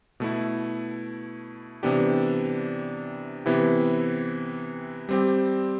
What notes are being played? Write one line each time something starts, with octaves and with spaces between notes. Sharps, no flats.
B2 A3 E4
C3 E3 B3 D4 G4
C3 E3 B3 E4 G4
G3 C4 G4